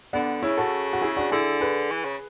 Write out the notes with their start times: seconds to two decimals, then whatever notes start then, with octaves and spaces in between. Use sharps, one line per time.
0.13 D3 B3 D4
0.42 C#3 C#4 E4
0.58 F#4 A4
0.93 F#4
1.01 E4 G#4
1.17 D4 F#4
1.32 D3 E4 G#4
1.61 G#4 B4
1.91 E3
2.05 C#3